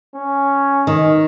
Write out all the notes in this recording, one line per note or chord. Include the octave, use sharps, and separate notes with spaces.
C#4
D#3